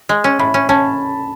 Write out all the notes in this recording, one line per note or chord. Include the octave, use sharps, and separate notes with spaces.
G#3
C#4
A2 B5
C#4
C#4 A5